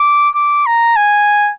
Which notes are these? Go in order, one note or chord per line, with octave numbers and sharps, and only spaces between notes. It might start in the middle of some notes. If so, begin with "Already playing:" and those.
Already playing: D6
D6
A#5
G#5